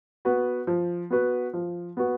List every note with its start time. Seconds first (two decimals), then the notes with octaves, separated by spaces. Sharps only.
0.25 B3 F#4 B4
0.67 F3
1.10 B3 F#4 B4
1.53 F3
1.97 B3 F#4 B4